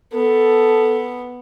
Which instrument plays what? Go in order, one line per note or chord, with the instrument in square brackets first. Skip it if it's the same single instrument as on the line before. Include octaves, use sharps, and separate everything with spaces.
[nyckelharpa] B3 [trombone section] A4